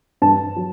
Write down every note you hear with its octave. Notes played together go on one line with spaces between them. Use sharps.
G2 A5
F#3